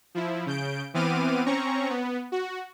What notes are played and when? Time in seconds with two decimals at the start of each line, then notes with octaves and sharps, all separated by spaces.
0.15 F3 E4
0.46 C#3 G6 D7
0.94 E3 B3 C4 D6 F6 D#7
1.46 C4 C#4 A#5 C#6
1.90 B3
2.32 F#4